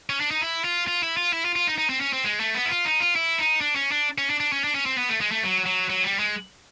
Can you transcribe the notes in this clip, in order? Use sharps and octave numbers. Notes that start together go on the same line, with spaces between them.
C#4
D4
D#4
E4
F4
F4
E4
F4
E4
F4
F4
D#4
D#4
C4
C#4
C4
G#3
A3
B3
E4
F4
D#4
F4
E4
D#4
D4
C#4
D4
C#4
D4
D4
C#4
D4
C#4
C4
B3
A3
G#3
A3
F#3
F#3
F#3
G3
G#3